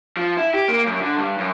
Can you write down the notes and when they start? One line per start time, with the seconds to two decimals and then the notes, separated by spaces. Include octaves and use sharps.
0.17 F3
0.37 E4
0.54 G4
0.68 A#3
0.86 F#2
1.00 D3
1.17 G2
1.38 F#2